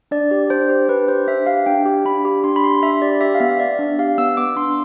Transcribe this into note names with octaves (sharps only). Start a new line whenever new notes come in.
D4 D5
G4
D4 C5
G4
D4 B4
G4 C5
D4 E5
G4 F5
D4 G5
G4
D4 B5
G4
D4 C6
B5
G4 C6
D4 E5
G4 D5
G4 E5
F5
B3 E5
B3 D5
D4
G4 F5
B3 E6
B3 D6
D4 C6